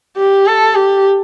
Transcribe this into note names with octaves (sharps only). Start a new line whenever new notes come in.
G4
A4
G4